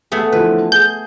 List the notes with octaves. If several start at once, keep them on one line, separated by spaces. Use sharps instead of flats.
A3 B3 G#4
D3 E3 F3 B4
G#4 G6